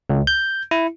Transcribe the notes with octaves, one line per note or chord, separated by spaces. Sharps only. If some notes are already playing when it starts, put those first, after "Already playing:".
C#2
G6
E4